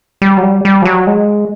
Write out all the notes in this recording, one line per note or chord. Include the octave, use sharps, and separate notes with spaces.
G3
F#3
G3
G3
F3
F#3
G#3